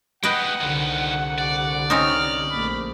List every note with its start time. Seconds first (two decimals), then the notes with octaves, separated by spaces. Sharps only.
0.23 G#3 B3 B4 D#5 F#5 G5
0.61 C2 D3 D#3 F4
1.39 D5
1.90 C4 C#4 D#4 F6
2.51 A#1 A3 B5